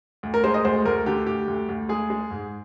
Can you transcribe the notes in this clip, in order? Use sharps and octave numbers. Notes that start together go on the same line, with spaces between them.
D2
A#4
G#3 C5
D#5
D2 C5
D2 A#4
D3 G4
D2 G4
D2
D2
G#3 G#4
G#3
G#2